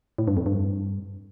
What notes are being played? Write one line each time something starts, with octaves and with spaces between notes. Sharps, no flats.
A2
G2
F2
G2